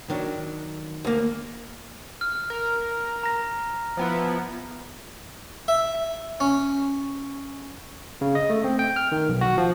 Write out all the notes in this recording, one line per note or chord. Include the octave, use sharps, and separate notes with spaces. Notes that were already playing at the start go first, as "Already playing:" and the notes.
D#3 F#3 D4
D2 A#3
F6
A#4
A#5 A#6
F3 B3 E4
E5
C#4
C#3
D#5
A3
C4
G5
F6
D#3
B1
F#4
F3